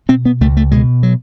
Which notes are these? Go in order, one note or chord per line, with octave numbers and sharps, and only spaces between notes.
B2 C4
B3
C#2 A3
A3
B2 G#3
F#3